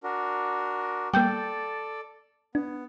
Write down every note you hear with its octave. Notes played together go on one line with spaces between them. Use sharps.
D4 F#4 A#4
G3 A#3 A4 D5 G5 G6
B3 D4